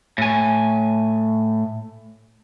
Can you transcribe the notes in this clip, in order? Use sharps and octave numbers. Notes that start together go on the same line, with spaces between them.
A2 G#5